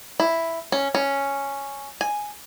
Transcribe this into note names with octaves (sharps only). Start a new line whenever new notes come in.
E4
C#4
C#4
G#5